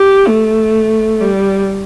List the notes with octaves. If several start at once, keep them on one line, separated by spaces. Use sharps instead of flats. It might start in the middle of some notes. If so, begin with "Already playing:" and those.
Already playing: G4
A3
G3